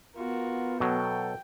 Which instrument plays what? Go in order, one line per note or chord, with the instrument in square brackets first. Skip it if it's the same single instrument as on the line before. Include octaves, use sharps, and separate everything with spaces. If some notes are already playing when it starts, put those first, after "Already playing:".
[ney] B3 [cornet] F4 [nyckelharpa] F#4 A#4
[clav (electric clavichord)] B2 F#3 [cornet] A4 [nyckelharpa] G5